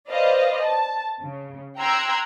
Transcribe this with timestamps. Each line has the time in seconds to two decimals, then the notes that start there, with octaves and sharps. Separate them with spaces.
0.10 B4 C5 D5 D#5 F5
0.63 A5
1.21 C#3
1.78 G5 A#5 C6 E6 F#6 G#6